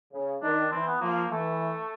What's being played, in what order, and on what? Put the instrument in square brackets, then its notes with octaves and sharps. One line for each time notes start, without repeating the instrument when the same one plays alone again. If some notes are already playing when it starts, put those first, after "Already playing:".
[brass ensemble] C#3
[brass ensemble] D#3 [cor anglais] D4
[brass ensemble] E3 [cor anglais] C4
[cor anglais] B3
[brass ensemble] F3 [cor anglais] A#3
[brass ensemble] E3 [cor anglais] A3